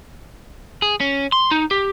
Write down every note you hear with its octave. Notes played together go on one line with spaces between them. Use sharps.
G#4
C#4
C6
D#4
G4